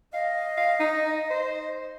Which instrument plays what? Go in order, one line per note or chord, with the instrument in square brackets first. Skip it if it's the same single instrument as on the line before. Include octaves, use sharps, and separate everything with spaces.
[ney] D#5 [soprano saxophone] F5
[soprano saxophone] F5
D#4
C5